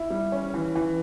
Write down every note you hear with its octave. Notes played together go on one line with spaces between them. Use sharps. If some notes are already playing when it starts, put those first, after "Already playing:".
Already playing: E4
G3
C#4
E3
E3